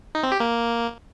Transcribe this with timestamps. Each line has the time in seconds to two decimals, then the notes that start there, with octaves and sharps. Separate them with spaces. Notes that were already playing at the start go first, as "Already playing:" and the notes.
0.15 D#4
0.23 C4
0.32 G4
0.40 A#3